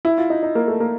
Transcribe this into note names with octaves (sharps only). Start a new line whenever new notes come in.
E4
F4
D#4
D#4
A#3
A3
A#3